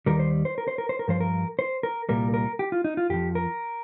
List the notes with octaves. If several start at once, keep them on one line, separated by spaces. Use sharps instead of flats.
D#2 D#3 G3 A#4
C5
C5
A#4
C5
A#4
C5
A#4
G2 F3 C5
A#4
C5
A#4
C2 A#2 G3 A#4
A#4
G4
F4
D#4
F4
F2 F3 G4
A#4